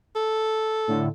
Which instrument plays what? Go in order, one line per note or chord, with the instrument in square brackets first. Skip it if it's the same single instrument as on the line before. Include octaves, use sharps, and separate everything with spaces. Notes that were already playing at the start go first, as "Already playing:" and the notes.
[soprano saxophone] A4
[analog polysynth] A2 D3